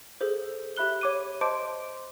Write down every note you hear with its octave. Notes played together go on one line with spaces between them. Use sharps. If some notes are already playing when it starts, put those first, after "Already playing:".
G#4 A4 C5
G4 E5 B5 F#6 G7
C#5 D6 D#7
C5 D#5 A5 C6 D6 D7